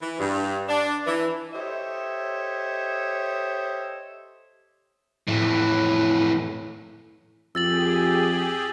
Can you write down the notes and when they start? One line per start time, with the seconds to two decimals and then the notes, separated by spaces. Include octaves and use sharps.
0.02 E3
0.19 G2
0.69 D4
1.06 E3
1.53 G4 A4 C5 C#5 D#5 E5
5.27 F2 A2 E3
7.55 F2 G4 G#4 E6 A6 F#7